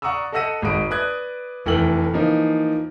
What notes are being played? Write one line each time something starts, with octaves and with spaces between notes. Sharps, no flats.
D5 F#5 A#5 C#6 D#6 E6
A4 D#5 F#5 E6 A#6 D#7
G#1 G#3 D#5 B5 D#6 D7
B4 D5 D#6 F#6 G#6
F1 E3 A3 G5 F6 F#7
E3 F3 A#3 D#4